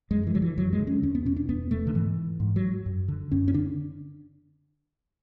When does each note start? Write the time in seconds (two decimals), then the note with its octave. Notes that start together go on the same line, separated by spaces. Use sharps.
0.11 F#2 G#3
0.27 E3
0.34 D3 F#3
0.42 E3
0.57 F#2 F#3
0.73 G#3
0.80 D3
0.87 C#4
1.02 E2 C#4
1.15 B3
1.25 B2 C#4
1.36 D4
1.48 E2 B3
1.71 B2 A3
1.87 D3
1.94 G#2 E3
2.40 G#2
2.56 F#3
2.86 F#2
3.08 D3
3.32 F#2 C#4
3.48 C#4
3.54 D3 D4